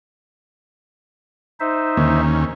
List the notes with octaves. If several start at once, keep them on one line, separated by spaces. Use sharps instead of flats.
D#4 C5 E5
D#2 D3 A#3 C#4